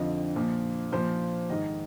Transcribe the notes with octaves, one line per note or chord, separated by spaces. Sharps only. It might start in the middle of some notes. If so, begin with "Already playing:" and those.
Already playing: F2 D3 F3 D#5
A#2 F3
A#2 F3 C5
G#2 D#3 D#5